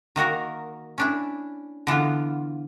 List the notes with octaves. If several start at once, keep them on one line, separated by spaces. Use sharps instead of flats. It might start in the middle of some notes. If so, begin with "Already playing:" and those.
D#3 A#3 F#4 A#4
C#4 D4 E4
D3 E3 B3 F4